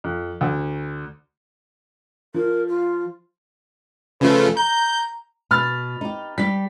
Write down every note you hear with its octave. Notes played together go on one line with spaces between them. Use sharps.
F2
D2
F3 A#4
F4
C#3 F3 A3 B4
A#5 G6
B2 B5 F6 A6
D#4 G4
G3 G4 B6